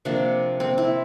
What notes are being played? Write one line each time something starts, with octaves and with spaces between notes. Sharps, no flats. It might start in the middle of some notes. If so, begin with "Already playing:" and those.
C3 F3 A#3 D4
C4
E4